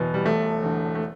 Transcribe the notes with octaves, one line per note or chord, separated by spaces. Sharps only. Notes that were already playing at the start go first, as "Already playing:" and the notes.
Already playing: F#1 E2 B2 B3
G3
E1 A3
E2 D3
A3